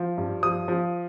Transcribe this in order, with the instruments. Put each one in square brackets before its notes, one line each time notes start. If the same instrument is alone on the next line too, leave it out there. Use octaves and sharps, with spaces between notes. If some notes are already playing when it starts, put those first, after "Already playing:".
Already playing: [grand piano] F3
G2
F3 D#6
F3